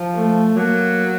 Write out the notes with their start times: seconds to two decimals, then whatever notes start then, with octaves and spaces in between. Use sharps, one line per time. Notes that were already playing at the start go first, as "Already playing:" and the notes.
Already playing: F3
0.14 A3
0.56 F#3 A#3